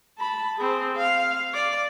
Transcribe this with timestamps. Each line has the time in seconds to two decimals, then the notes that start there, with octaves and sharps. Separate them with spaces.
0.18 A5 B5
0.56 C4 G#4
0.96 F5
1.54 D5